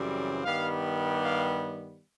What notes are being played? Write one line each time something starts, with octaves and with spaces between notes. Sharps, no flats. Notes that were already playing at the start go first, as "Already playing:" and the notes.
Already playing: F#2 C#3 E3 G3 C4
G2 D#3 G3 B3 F5
F5